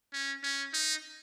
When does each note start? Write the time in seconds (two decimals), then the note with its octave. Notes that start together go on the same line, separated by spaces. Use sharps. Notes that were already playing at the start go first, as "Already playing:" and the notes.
0.13 C#4
0.43 C#4
0.74 D#4